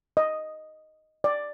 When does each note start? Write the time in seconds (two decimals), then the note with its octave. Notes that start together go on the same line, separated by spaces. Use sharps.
0.17 D#5
1.24 D5